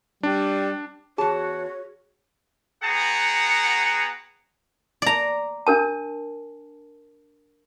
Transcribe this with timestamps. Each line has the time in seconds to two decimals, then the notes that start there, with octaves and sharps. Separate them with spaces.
0.23 G3 D4
1.18 E2 F#4 G#4 C#5 A5
2.84 B3 F#4 G#4 F#5 G5 A#5
5.02 D5 A#5
5.67 D4 A#4 A5